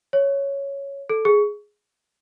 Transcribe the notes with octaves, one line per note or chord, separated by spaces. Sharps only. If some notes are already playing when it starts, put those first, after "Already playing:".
C#5
A4
G#4